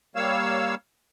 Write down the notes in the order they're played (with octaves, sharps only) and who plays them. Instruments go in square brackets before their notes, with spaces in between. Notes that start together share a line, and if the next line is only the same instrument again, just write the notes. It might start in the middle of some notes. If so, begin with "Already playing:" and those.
[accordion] G3 A#3 C#5 F5 E6